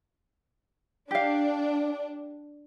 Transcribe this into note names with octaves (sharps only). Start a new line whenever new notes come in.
D4 G4 F5